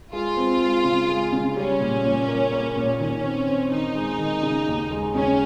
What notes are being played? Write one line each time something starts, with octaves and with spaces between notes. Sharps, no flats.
G#3 F4
C4
G#3
C#3
G#3
C#3
G3 C#4
A#2
A#2
A#3
A#3
A#2
D#3 C#4
C4
C4
D#3 D#4
G#3
D#3
C#3
D#2
G#3
C#3 C#4